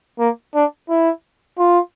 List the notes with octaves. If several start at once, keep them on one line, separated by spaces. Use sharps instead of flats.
A#3
D4
E4
F4